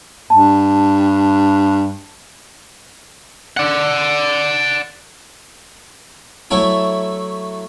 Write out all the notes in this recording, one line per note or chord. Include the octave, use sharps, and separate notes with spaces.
G2 A5
D5 F#5
F#3 A3 E4 C#5